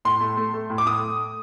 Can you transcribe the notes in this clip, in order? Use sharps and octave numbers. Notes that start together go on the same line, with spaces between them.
A2 C6
A3
A3
A3
A2
D6
A3 D#6